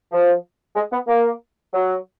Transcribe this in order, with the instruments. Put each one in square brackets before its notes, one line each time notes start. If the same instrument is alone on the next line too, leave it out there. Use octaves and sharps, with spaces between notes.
[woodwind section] F3
G#3
B3
A#3
F#3